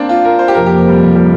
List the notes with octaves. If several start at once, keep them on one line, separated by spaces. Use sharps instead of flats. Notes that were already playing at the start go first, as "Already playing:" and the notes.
Already playing: A#3 C4 D4
F4
A#4
C5
G4
F2 C3 F3 A#3 A#4
G4
G3
G3